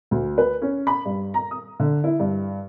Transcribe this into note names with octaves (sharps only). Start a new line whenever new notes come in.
D2
B4
C#4
B5
G2
A#5
D#6
D3
E4
G2